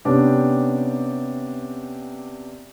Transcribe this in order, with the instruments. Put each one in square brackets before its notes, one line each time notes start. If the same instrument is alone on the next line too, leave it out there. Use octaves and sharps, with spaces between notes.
[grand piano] C3 B3 C#4 D4 G4